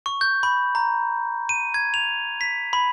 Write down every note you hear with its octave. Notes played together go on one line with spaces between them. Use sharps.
C#6
G6
B5
A#5
D#7
G#6
F7
B6
B5